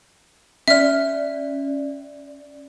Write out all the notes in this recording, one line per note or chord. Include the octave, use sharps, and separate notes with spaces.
C#4 D5 E5 F6